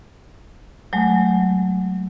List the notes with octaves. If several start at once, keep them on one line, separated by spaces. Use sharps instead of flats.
F#3 G#3 A3